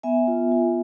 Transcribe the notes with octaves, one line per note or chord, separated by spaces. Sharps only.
B3 E5 G#5
F4
F4